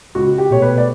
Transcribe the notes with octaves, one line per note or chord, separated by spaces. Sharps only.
C#2 F#4
G4
B2 A3 C#5
B4
D5